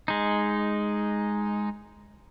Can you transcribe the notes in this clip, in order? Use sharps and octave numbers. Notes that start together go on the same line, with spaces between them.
G#3 D#4